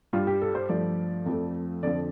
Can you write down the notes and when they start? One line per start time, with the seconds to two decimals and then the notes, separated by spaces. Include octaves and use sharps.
0.13 G2 G3 F4
0.27 G4
0.42 A4
0.55 C5
0.69 G2 F3 A3 D5
1.26 F2 F3 A3
1.83 F2 D3 F3 D5